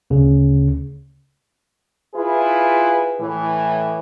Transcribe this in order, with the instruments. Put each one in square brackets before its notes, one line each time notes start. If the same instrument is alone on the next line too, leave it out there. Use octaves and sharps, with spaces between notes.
[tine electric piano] D2 C#3
[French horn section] E4 F4 G#4 B4
A2 E3